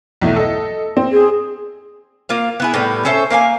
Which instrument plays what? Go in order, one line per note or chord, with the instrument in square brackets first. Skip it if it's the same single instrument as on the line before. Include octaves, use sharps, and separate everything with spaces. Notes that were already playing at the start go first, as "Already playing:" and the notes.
[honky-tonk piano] B1 E2 A3
A4 D#5
C4
[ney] G#4
[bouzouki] A#3 F4 F5
B3 E4 G#4
A2 G3 B3
C#4 A4 C5 E5
A#3 F5 G5 G#5